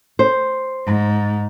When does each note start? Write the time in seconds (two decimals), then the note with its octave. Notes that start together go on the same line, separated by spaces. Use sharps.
0.19 C5
0.86 G#2